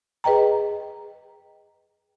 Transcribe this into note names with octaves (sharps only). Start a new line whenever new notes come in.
G#4 B4 D#5 G5 A#5